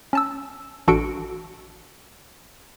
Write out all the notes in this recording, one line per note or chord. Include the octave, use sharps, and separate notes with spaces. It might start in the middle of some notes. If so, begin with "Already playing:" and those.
C#4 A5 E6
A1 D4 F#4 A4 C#7 D7